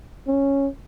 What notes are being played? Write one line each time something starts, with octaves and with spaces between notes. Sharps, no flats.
C#4